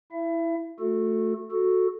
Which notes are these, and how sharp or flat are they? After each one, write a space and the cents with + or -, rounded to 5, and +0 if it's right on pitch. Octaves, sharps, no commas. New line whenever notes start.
E4 +0 E5 +30
A3 +0 F#4 -25 A4 +5
F#4 -5 A4 +0